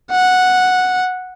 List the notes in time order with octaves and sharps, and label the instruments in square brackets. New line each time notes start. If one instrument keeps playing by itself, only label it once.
[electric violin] F#5